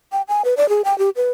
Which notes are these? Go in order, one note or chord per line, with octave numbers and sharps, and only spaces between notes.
G5
G#5
B4
D5
G#4
G5
G4
B4